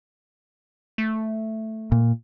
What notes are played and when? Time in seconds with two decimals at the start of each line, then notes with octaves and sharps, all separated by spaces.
0.98 A3
1.92 A#2